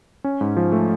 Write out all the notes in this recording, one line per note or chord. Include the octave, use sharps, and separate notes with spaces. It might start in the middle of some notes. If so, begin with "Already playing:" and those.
C#4
G#2
F3
A3